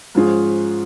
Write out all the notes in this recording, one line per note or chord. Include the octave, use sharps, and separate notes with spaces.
G#2 F3 C#4 F4 G#4